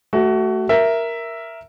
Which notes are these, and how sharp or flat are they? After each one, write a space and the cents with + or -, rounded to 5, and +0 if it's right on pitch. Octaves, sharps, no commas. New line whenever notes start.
A3 +0 F#4 +25
A#4 +0 E5 +5